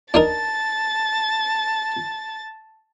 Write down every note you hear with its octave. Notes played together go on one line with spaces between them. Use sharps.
D4 D#4 A#4 A5 A6